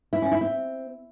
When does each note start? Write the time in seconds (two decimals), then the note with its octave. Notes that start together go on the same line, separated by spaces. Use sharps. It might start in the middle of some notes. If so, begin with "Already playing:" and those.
0.13 E4
0.22 C#4
0.32 E4
0.41 C4